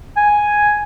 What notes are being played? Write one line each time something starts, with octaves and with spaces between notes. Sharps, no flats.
G#5